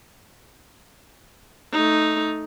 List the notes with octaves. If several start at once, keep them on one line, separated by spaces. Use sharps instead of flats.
A3 D#4